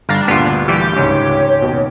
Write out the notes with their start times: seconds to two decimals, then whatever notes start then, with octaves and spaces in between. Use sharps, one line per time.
0.09 G1 G3 D4 F5 A#5
0.28 D2 G2 A#2 B3 F4
0.68 E3 G3 G4
0.97 C#2 G#2 C#5
1.62 D#2 B2